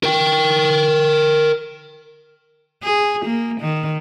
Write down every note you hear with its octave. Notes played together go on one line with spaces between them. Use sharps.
A#4 G5
G#4
A#3
D#3